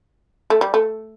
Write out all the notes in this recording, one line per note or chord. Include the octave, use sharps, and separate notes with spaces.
A3
G3
A3